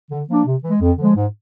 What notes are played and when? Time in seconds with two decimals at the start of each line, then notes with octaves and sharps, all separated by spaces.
0.11 D3
0.29 F3 A#3 D4
0.46 C3
0.63 E3 G#3
0.81 F2
0.98 D3 F3 G#3
1.15 G#2